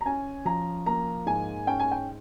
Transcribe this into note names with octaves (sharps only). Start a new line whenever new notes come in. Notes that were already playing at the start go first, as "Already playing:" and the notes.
A#5
C#4 G#5
F3 A#5
A#3 A#5
G#2 G#5
C#4 G5
G#5
G5